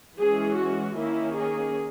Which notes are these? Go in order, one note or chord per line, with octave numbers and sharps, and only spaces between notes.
E3 G#3 C#4 G#4
F#4
D#3 A#3 C#4 E4
G#4